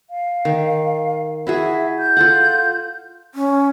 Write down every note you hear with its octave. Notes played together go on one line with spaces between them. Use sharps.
F5
D#3
E4 F#4 G#4 E5
G6
F4 A4 F#5
C#4